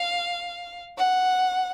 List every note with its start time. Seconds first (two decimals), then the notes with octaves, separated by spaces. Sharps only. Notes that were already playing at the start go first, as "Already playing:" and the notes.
Already playing: F5
0.98 F#5